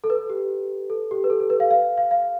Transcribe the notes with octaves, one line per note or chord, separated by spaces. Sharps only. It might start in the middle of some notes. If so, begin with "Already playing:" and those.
A4
B4
G4
A4
G4
B4
A4
A4
B4
F5
F5
F5
F5